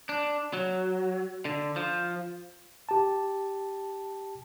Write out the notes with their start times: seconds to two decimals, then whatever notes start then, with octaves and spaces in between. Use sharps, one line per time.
0.09 D4
0.53 F#3
1.45 D3
1.76 F3
2.89 G4 A5